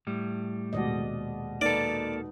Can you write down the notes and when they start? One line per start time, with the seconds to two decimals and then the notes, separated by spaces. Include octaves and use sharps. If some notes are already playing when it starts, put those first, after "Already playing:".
0.07 A2 G3
0.73 D#1 B2 G#3 D5 D#5
1.61 A#3 D#4 A4 B4 D5